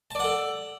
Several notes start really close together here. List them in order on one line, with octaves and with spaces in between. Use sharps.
A5 D5 F#5 A4